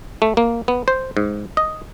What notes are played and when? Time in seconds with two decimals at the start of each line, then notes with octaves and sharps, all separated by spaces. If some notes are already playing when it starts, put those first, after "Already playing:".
0.22 A3
0.37 A#3
0.68 B3
0.88 C5
1.17 G#2
1.57 D#5